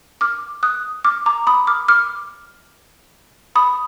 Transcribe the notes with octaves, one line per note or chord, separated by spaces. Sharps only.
D6 F6
D#6 F#6
D6 F6
A#5 D6
B5 D#6
D6 F6
D6 F6
B5 D#6